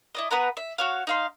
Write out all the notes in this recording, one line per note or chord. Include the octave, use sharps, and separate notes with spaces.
E4 D5 D#5
B3 B4 F#5 A#5
E5
F#4 C#5 F5
D#4 F5 C6